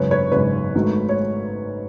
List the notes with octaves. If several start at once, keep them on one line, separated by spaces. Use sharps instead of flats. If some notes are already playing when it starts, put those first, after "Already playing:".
Already playing: G#1 F#2 C#3 B4 C#5
B4 C#5
G#1 F#2 C#3 B4 C#5
G#2 D#3 F#3 A3
C#5